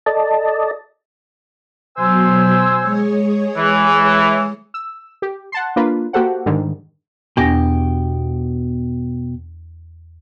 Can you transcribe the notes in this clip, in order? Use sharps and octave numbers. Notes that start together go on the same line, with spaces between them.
A4 D5 D#5 A5
B2 F#3 C5 G#5 E6
G#3 G#4 C#5
E3
E6
G4
F#5 A5 C6
A#3 D4 F4 B4
A#3 F#4 G4 A4 C5 F#5
G#2 D3 D#3 G3
E2 B2 D4 G4 A#6